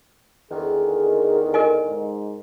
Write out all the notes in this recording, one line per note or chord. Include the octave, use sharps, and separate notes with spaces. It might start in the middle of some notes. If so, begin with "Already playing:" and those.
E2 D3 D#3 G#4
A#4 D#5 G#5
G#2